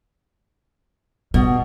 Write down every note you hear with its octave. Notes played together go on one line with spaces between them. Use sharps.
B2 G3